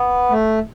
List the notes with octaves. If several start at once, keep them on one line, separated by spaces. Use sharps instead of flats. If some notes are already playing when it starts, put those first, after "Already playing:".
Already playing: B3
A3